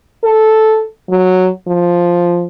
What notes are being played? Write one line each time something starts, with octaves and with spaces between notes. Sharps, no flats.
A4
F#3
F3